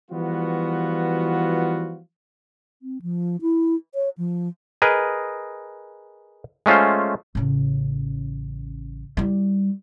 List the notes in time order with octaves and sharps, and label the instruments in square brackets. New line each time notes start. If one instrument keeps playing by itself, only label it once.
[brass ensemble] E3 F3 G3 B3 F4 F#4
[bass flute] C4
F3
E4
C#5
F3
[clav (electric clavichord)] G#4 A#4 B4 D#5
G#3 A3 C#4 F4 C5
[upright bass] A1 C#3
G3 E4